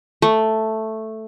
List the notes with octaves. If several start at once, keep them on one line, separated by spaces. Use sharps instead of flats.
A3